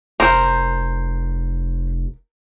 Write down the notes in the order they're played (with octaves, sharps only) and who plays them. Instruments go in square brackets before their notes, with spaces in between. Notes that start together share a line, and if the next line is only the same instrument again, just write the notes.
[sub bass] F1 [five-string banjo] A#4 [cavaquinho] C5